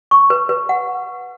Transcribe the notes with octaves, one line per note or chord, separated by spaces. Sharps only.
C#6
B4
B4
F#5